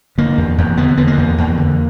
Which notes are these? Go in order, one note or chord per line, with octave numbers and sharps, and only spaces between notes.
D3 A#3
E2
E2
D3 B3
D3 B3
A#3
E2
E2
D3